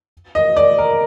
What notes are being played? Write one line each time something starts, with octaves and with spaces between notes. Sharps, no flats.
D#5
D5
A#4